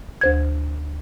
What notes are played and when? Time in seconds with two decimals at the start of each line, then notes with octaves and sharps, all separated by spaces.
0.21 D2 C5 G#6